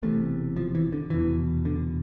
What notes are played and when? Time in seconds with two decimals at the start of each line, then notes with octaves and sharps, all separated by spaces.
0.03 E1 E2 C3 A3
0.57 F3
0.75 E3
0.92 D3
1.10 F1 E2 B2 E3
1.65 D3